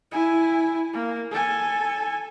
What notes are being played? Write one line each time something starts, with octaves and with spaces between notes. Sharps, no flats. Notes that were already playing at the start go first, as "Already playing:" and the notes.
E4 G#5
A#3
A4 G#5